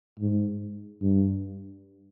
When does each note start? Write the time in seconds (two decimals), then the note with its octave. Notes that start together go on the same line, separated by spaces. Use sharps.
0.20 G#2
1.02 G2